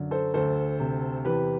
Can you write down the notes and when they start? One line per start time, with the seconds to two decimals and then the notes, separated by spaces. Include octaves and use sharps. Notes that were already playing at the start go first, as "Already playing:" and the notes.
Already playing: F#2 D3
0.11 A4 C5
0.34 D2 A4 C5
0.80 C3
1.25 E2 G4 B4